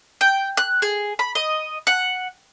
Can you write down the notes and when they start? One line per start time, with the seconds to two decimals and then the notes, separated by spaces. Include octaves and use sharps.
0.21 G5
0.57 F#6
0.82 G#4
1.19 B5
1.35 D#5
1.87 F#5